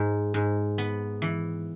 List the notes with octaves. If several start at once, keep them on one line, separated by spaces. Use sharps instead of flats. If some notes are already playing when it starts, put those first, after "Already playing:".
Already playing: G#2
G#2
B3
E3